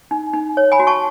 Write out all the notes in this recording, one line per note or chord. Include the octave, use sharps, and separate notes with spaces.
D#4
D#4
C#5
G#5 B5
F#4
A5 C#6